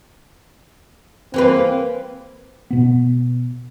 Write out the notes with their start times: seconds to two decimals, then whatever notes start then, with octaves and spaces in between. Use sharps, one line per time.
1.34 E3 A#3 C4 B4
2.71 B2 B3